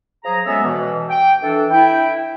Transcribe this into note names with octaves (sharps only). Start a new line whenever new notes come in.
F3 F#3 G#4 A#5
F#3 G#3 B3 C#4 A4 E5
B2 E3
G5
E3 D4 A4
E4 G5